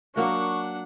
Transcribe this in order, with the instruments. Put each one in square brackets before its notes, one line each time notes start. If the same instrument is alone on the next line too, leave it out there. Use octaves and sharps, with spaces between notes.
[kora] F#3 A#3 F#4 [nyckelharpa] D4 F#5 [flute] C#6